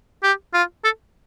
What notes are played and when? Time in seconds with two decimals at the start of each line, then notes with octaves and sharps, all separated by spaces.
0.23 G4
0.54 F4
0.84 A4